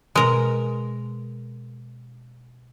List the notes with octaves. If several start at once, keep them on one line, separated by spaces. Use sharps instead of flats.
B2 G#3 A#4